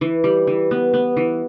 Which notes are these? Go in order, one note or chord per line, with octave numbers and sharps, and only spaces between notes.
E3
G3
E3
B3
B3
E3